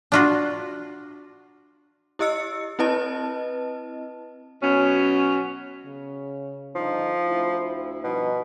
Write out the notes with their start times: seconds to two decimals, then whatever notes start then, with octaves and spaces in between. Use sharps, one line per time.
0.12 D4 F4 F#4
2.19 E4 G4 D#5 E6 C#7
2.79 C4 E4 B4 D#5 A5
4.63 B2 F#3 C#4
5.85 C#3
6.75 G2 D3 F3 D#4
7.26 D2 E4
8.04 G2 B2 F3 D#4